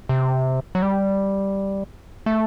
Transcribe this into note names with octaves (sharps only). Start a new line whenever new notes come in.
C3
F#3
G3
A3